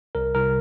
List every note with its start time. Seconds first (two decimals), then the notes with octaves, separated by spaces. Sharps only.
0.15 C2 A#4
0.35 C2 A#4